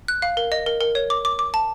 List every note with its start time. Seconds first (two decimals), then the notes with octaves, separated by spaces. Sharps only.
0.08 F#6
0.22 F5
0.37 A#4
0.52 D#5
0.66 A#4
0.81 A#4
0.95 C#5
1.10 D6
1.25 D6
1.39 D6
1.54 A5